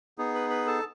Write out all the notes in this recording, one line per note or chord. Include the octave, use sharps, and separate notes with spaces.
B3 D#4 G#4
B4 B5
B4 B5
A4 A5